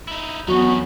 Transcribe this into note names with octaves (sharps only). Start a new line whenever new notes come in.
D#4 E4
E2 F#3 B3 C#4 D#4 F#4